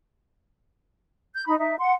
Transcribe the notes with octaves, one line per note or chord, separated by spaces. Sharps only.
G6
D#4 B5
D#4 E5
F#5 C6